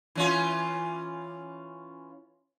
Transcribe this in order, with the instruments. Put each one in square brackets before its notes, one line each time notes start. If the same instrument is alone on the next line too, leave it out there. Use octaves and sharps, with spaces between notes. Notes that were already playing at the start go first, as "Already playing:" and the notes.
[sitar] E3 C#4 F4